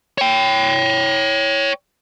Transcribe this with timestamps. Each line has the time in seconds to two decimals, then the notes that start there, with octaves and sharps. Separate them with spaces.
0.18 C#5 G5